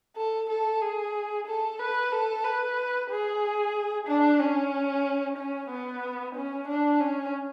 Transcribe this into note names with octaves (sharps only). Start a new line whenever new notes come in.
A4
A4
G#4
A4
B4
A4
B4
G#4
D4
C#4
C#4
B3
C#4
D4
C#4